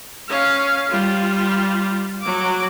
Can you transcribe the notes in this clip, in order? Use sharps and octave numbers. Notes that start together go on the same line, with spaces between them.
C#4 F5
G3 F4
F#3 D6